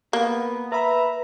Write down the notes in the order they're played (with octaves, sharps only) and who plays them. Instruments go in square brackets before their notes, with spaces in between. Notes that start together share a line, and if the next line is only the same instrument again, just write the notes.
[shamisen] A#3 [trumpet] B3
[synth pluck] B4 B5 [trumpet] E5 [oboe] A#5